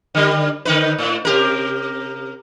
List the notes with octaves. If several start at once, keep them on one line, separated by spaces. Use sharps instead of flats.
D3 G3
D3 D#4 B4
A2
C3 G4 A#4